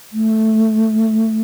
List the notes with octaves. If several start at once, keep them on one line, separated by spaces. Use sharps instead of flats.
A3